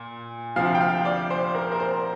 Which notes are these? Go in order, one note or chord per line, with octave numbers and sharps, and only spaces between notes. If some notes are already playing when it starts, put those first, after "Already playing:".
Already playing: A#2
D2 C3 F3 F5
G5
F5
D5
C5
A#4
A#4
C5